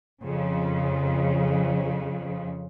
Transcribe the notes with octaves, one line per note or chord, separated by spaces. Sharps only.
F2 C#3